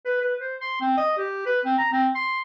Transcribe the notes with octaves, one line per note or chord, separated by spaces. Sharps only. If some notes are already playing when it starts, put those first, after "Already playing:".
B4
B4
C5
C6
C4
D#5
G4
B4
C4
A#5
C4
C6